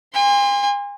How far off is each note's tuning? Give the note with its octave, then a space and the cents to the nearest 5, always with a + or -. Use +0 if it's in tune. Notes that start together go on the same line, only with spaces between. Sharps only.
G#5 -40 C6 +0